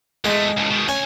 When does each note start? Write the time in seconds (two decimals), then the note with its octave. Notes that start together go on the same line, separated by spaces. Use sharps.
0.25 E2 G#3 A3
0.57 C#2 A2
0.71 B2 D#3
0.88 D2 C#4 G#5